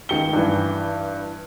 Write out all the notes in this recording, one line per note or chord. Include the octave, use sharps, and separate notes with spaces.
C#2 D#3 C#7 G7
G2 E3